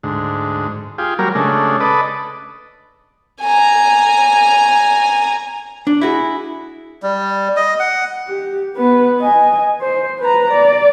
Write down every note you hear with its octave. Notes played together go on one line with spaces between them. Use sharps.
D2 G#2
F4 G4 G#4
F#3 G3 A#3 A#4
C#3 G#3 A3 D4
A4 B4 D5 D#5
G#5 A#5
D4
E4 F#4 G#4
G3
D#5
F#5
G4
B3 B4
D#5 G#5
C5
B4 A#5
D5